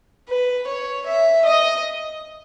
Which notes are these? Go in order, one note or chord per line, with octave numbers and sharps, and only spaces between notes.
B4
C#5
E5
D#5